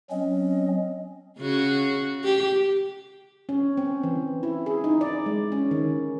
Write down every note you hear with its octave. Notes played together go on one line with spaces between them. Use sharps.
F#3 C4 C#4 D#5
C#3 F#4
G4
C#4
C4
E3
E4
G#4
D#4
D5
G#3
C#4
D#3